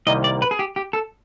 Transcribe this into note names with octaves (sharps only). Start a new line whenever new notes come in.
C2 C3 D#3 G3 A#3 D#5
D5
B4
G#4
G4
G4
A4